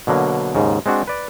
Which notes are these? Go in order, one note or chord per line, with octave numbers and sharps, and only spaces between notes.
B2 D3 F#3 A#3
D#2 G#2 C#3
G#3 C4 D4 F#4
B4 D5